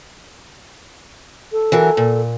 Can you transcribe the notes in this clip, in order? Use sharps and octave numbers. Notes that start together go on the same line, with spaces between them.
A4
E3 F#3 A#4
A#2